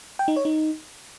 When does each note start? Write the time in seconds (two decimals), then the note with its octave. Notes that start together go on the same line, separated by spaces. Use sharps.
0.19 G5
0.28 D#4
0.36 C#5
0.45 D#4